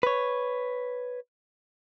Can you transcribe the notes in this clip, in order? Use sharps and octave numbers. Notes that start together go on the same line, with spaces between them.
B4 C#5